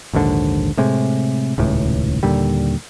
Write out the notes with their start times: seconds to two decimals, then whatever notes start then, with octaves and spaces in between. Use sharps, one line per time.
0.13 A#1 D#2 G#2 D3
0.77 A2 C3 G#3
1.58 D#1 C#2 A2
2.23 D#2 A#2 D3 G3